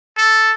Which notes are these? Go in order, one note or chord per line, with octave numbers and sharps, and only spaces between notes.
A4